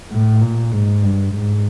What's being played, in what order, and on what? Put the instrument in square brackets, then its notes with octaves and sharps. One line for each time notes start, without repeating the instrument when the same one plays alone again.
[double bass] A2
A#2
G#2
G2
G#2